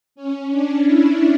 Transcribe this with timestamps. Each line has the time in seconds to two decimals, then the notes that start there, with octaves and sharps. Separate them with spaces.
0.15 C#4
0.51 D4
0.86 E4